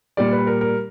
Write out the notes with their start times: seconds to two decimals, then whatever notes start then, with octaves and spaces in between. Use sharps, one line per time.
0.17 A#2 G3 D5
0.32 B4
0.47 A#4
0.61 A#4